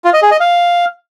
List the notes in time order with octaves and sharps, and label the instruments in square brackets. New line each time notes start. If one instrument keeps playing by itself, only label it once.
[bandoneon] F4
D#5
G#4
D#5
F5